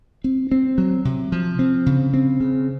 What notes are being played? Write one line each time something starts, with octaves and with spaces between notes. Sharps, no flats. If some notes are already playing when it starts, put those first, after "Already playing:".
C4
C4
F#3
C3
F3
C4
C#3
C4
C#3